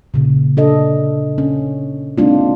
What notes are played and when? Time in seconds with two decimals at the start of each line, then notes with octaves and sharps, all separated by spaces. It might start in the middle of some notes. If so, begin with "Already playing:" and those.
0.14 A#2 C#3
0.57 D4 A4 D#5
1.38 C#4
2.18 G#3 A#3 C4 D4 D#4 F4